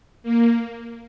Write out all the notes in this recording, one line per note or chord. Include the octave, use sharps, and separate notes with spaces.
A#3